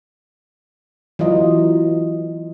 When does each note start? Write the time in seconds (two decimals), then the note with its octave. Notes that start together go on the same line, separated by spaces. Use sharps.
1.19 E3 F#3 E4 F4 D#5